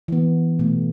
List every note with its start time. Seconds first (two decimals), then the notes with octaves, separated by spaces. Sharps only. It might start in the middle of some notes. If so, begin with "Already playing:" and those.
0.08 E3 B3
0.59 B2 A3